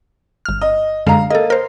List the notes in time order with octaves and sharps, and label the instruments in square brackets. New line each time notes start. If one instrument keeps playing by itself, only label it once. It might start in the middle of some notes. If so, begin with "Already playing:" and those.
[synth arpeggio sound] G1 F6
[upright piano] D#5
[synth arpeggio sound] F#2 D3 G#3 [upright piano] F5 A#5
[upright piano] A#3 [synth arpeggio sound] A4 D#5
[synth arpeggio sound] A#4 C5